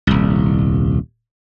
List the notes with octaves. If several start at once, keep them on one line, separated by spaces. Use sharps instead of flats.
D#1 C2